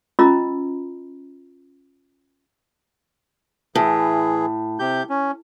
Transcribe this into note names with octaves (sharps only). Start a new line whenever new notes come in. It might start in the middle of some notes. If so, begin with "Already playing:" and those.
C#4 F4 D#5 A#5 B5 E6
A2 E3 G#4
C3 G4 G6
C#4